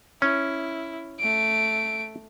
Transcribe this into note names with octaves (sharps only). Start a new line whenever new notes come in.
C#4 E4
A3 D7